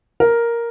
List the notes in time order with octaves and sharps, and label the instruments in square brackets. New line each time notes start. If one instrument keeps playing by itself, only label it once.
[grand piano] A#4